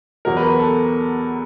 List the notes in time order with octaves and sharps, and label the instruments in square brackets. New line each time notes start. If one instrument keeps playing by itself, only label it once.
[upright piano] E2 B2 F#3 [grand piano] A#4
[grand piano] B4
B4
A4